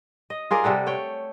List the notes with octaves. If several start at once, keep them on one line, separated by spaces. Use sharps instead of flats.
D#5
F4 G#4 A#4 D5
C3 G3 A4 F#5
A3 C#5 G5